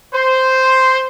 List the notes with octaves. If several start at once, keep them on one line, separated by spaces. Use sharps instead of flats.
C5